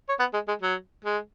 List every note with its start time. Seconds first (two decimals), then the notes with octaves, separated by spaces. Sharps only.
0.09 C#5
0.19 B3
0.34 G#3
0.48 G#3
0.62 F#3
1.05 G#3